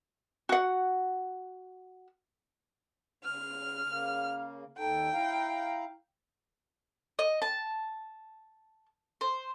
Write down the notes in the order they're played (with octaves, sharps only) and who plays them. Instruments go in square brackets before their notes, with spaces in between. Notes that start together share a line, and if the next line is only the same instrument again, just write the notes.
[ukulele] F#4 F#5
[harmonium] C#3 [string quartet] F6
[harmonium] C#3 A#3
[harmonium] D#2 D#4 A4 [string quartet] G5
[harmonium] E4 F5 A#5
[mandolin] D#5
A5
C5